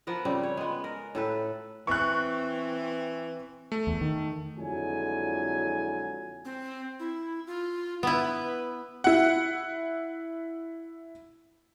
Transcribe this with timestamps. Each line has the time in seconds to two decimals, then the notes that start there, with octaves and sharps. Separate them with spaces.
0.07 F3 B3 A#4
0.25 C#3 G3 C4
0.43 C#5
0.57 G#3 B3
0.84 A#4
1.15 A2 A4 B4
1.87 E3 C4 C#6 F#6
3.72 A3
3.87 E2
4.01 D#3
4.57 F2 D3 F#3 G#3 E4 G#5
6.45 C4
7.00 E4
7.47 F4
8.03 B3 E4 B4
9.04 E4 F#5